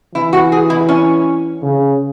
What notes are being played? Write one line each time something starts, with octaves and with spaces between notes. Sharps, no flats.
E3 E4
F#4
G#4
E4
C#4
C#3